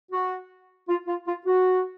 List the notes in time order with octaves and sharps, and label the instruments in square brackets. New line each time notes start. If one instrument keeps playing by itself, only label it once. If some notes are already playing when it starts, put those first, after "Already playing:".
[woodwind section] F#4
F4
F4
F4
F#4